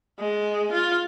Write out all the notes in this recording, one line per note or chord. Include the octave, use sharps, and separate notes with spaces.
G#3
F4